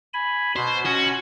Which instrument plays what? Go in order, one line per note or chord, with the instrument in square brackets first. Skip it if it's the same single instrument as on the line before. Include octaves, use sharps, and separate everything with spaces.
[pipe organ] G#5 B5
[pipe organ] B2 [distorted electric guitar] C5
[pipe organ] C#4 G#5 [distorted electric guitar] F#4